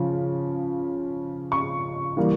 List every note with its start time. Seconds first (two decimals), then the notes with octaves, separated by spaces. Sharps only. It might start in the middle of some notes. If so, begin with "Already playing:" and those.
Already playing: C#3 F3
1.52 C#6
2.17 E3 G3 A#3